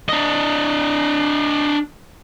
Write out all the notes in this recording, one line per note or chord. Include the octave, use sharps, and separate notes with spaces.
D4 D#5